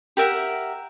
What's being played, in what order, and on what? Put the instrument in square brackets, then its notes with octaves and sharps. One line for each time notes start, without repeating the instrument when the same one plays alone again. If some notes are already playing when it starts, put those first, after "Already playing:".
[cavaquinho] G4 A#4 E5 F#5